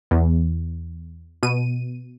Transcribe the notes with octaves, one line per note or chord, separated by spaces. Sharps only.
E2
B2 D#7